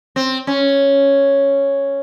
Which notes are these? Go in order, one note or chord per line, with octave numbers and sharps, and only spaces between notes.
C4
C#4